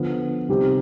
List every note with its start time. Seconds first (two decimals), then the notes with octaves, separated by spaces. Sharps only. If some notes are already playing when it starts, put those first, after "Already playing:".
Already playing: D3 F3 B3 F4
0.49 C3 G3 C4 D#4 G4